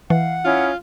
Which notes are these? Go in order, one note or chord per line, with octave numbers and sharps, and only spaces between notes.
E3 F5 F#5
C#4 E4 F4 D#6